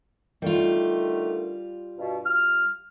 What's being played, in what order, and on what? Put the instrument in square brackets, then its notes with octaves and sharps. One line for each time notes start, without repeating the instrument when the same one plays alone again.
[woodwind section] D3 D#3 A3 [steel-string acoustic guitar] G3 F4
[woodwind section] G2 B2
F6